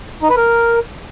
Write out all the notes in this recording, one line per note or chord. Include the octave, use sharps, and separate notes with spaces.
D#4
B4
A#4